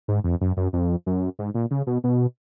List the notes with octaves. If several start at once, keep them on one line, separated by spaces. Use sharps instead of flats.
G#2
F2
F#2
F#2
F2
F#2
G#2
A#2
C#3
B2
B2